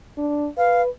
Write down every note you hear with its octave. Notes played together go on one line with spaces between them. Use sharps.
D4
B4 F5